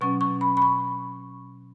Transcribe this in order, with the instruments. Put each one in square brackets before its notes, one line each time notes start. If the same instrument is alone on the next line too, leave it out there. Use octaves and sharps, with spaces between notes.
[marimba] B2 F#3 C#4 C#6
C#6
B5
B5
C#6